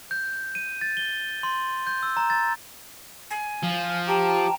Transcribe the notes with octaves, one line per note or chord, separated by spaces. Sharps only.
G6
D#7
A6
G7
C6
G6
E6
A#5
A6
G#5
F3
G4 G5 A5 A#5 D6